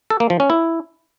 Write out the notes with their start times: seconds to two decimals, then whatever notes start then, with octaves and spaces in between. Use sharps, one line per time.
0.10 A4
0.20 A#3
0.30 F3
0.40 C#4
0.50 E4